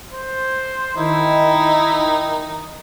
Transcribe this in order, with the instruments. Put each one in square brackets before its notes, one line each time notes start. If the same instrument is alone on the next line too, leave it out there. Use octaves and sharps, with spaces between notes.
[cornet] C5
[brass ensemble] D#3 [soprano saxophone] D#4 [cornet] E4